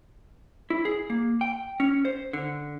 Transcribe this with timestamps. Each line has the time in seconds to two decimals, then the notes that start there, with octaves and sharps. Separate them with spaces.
0.70 E4
0.85 G#4
1.10 A#3
1.41 G5
1.80 C#4
2.05 C5
2.33 D3